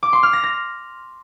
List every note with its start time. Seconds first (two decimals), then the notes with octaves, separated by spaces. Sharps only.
0.03 D6
0.13 C6
0.23 F6
0.33 A#6
0.43 A#6